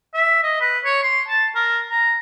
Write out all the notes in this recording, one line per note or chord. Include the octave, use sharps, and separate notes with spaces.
E5
D#5
B4
C#5
C6
A5
A#4
A#5